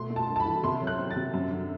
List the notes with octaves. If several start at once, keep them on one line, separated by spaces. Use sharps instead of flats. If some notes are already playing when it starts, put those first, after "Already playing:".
Already playing: B2 A3 C6
A3
A5
G2
A5
B5
E3
C3 C6
F#3
F#6
C4
A6
C3
F#2
D3